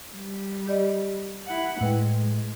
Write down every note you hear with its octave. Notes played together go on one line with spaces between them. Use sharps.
G3
G4 D5 D#5
E4 F#5
A2 G#3 E4 B4 G5